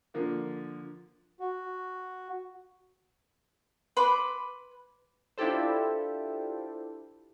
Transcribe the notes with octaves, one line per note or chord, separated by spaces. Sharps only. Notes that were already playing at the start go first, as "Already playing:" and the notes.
D3 F3 A#3
F#4
B4 B5 C6 D6
D4 E4 F4 G4 A4 C5